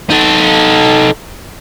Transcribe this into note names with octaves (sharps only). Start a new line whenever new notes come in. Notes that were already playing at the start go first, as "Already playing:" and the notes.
D#4 A4